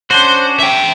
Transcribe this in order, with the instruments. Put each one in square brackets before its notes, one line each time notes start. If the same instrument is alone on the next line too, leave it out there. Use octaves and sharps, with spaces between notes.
[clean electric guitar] C#4 D4 F#4 [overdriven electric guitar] C5
[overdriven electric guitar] E5 G5